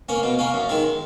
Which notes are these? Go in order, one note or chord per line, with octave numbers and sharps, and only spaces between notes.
A#3 C#4
B2
A#3 C#4
F#2
D#3 G#3